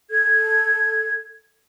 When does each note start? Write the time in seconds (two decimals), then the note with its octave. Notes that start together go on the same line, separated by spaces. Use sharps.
0.10 A4 G#6